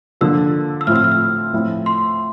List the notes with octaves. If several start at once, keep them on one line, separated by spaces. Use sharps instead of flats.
D3 F3 A#3 E6
E6
A2 F3 C4 E4 F6
E6
F6
E6
A2 F3 C4 E4
C6